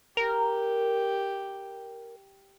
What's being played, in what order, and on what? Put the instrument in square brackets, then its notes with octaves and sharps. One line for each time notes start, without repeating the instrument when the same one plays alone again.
[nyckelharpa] G4 [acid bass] A#4